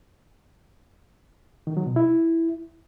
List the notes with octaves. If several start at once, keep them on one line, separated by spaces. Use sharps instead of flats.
D#3
F#3
B2
E4